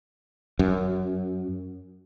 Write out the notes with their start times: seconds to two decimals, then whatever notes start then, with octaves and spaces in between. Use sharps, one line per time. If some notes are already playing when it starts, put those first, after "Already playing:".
0.59 F#2